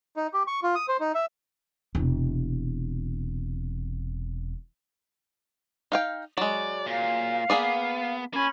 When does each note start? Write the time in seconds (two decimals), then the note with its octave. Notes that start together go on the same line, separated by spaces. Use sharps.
0.16 D#4
0.34 G4
0.47 C#6
0.63 F4
0.75 D#6
0.88 C5
1.00 D#4
1.15 E5
1.95 E1 C3
5.92 D#4 F5 G5
6.38 F#3 G#3 D5
6.86 A#2 F5
7.50 A#3 B3 G#4 D5
8.33 A#3 C#4 G#5 B5 C6